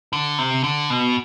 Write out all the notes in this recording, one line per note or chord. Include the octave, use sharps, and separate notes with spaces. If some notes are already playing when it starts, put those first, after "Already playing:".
D3
C3
D3
B2